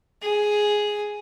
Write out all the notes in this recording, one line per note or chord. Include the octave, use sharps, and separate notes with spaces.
G#4